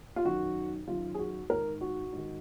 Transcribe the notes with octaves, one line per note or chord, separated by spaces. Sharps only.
F4
F#2 D#3 F#4
F#2 D#3 F4
G#4
F#4
G#2 D#3 A#4
F#4
G#2 D#3